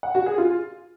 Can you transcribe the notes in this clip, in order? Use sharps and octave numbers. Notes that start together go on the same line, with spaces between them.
F#5
F#4
G#4
F4